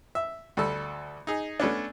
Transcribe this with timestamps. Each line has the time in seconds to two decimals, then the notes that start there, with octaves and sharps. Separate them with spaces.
0.15 E5
0.57 D2 G3 A4
1.27 D#4 G#4
1.60 A3 B3 C#4 D4